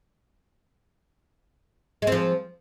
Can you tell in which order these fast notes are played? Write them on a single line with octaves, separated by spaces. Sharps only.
G#3 C4 F3